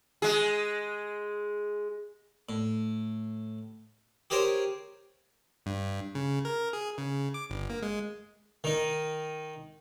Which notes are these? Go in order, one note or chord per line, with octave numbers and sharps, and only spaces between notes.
G#3 G#4
A2
G4 G#4 A#4 C5 C#5
G2
C#3
A#4
G#4
C#3
D6
G1
A#3
G#3
D#3 D#4